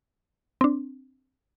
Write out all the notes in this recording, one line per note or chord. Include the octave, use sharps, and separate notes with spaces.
C4 D4